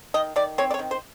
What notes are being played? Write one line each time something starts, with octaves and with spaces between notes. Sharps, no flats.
D#3 D#5
D#3 D5
C4 C#5
D5
C#5
D#3
C5